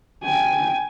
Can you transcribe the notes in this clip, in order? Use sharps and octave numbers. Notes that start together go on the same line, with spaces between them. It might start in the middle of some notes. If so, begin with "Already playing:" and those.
G5 G#5